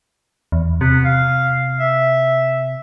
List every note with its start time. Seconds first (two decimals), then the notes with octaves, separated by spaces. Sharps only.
0.52 E2
0.81 C3 B3
1.05 F5
1.80 E5